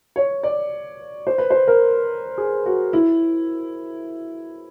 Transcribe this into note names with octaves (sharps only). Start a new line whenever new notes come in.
C#5
D5
C5
B4
C5
A#4
G#4
F#4
E4